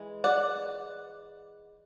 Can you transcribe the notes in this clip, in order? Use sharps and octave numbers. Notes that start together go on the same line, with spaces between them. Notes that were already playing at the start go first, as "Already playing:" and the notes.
Already playing: E3 G#3
D5 F#5